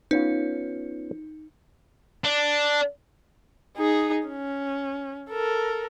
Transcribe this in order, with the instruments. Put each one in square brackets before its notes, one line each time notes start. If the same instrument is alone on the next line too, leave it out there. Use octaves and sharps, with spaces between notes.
[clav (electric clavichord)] B3 C#4 F4 [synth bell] D#4
[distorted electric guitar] D4
[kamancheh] D#4 G#4
C#4
A4 A#4